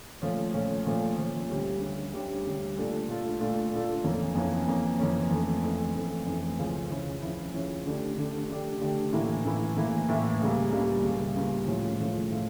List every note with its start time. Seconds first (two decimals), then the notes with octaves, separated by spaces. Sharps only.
0.22 A#2 F3 A3 C#4
0.54 A#2 F3 A3 C#4
0.86 A#2 F3 A3 C#4
1.18 A#2 F3 A3 C#4
1.49 D2 D3 G3 C#4 G4
1.81 D2 D3 G3 C#4 G4
2.13 D2 D3 G3 C#4 G4
2.45 D2 D3 G3 C#4 G4
2.77 A#2 A3 D4 F4 A4
3.09 A#2 A3 D4 F4 A4
3.40 A#2 A3 D4 F4 A4
3.72 A#2 A3 D4 F4 A4
4.04 F2 E3 A#3 C#4
4.35 F2 E3 A#3 C#4
4.68 F2 E3 A#3 C#4
4.99 F2 E3 A#3 C#4
5.31 F2 E3 A3
5.63 F2 E3 A3
5.95 F2 E3 A3
6.27 F2 E3 A3
6.59 C#2 C#3 F3 C#4 E4
6.90 C#2 C#3 F3 C#4 E4
7.22 C#2 C#3 F3 C#4 E4
7.54 C#2 C#3 F3 C#4 E4
7.86 D3 A3 D4 G4
8.18 D3 A3 D4 G4
8.50 D3 A3 D4 G4
8.81 D3 A3 D4 G4
9.13 A2 E3 A#3 E4
9.45 A2 E3 A#3 E4
9.76 A2 E3 A#3 E4
10.09 A2 E3 A#3 E4
10.40 C#2 C#3 G3 A#3
10.72 C#2 C#3 G3 A#3
11.04 C#2 C#3 G3 A#3
11.35 C#2 C#3 G3 A#3
11.67 A2 F3 A3 C#4 F4
12.00 A2 F3 A3 C#4 F4
12.31 A2 F3 A3 C#4 F4